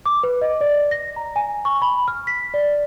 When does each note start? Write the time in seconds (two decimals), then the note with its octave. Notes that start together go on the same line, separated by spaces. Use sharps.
0.06 D6
0.23 B4
0.41 D#5
0.61 D5
0.91 A#6
1.16 A#5
1.36 G#5
1.65 C#6
1.82 B5
2.08 F6
2.27 B6
2.54 D5